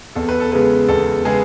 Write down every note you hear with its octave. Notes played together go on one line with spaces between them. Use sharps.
E2 A4
B4
A4
C#3 G#3 B3 B4
E2 A4
C#3 G#3 B3 G#4